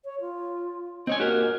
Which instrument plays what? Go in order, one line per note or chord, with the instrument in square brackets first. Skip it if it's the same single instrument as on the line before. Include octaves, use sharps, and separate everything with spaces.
[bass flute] C#5
F4
[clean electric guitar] C4 C#5 G#5 [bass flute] D#5
[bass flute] A#3 [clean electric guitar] F#4 G4 A#4